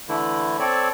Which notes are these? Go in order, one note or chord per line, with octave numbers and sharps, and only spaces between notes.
D3 E3 A3 E4
C4 A4 C#5 D5